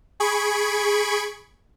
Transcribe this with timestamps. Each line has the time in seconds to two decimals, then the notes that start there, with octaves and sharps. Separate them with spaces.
0.20 G#4 B5 C#6 G#6 D7